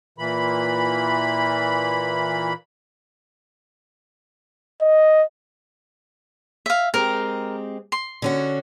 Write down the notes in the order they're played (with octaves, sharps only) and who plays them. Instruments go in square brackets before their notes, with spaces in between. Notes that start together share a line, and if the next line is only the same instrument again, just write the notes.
[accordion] A#2 E3 B5
[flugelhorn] D#5
[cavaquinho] E5 F5
[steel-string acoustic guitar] G#3 C4 G4 [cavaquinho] A#4
[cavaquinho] C6
[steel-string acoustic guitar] D3 C#4 F#4